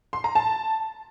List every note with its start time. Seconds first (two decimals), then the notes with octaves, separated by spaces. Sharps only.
0.13 C6
0.24 A#5
0.35 A5